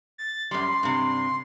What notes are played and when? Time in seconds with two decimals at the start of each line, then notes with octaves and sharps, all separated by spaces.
0.18 A6
0.51 F#2 G3 C6
0.83 G2 C3